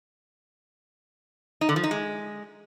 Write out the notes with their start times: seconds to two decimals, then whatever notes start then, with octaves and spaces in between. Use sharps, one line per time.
1.61 D#4
1.69 D3
1.76 F3
1.84 D#4
1.91 G#3